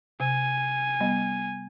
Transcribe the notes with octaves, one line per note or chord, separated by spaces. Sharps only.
C3 G#5
G3 B3 D#5